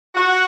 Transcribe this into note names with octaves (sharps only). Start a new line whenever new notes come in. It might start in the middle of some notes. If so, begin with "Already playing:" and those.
F#4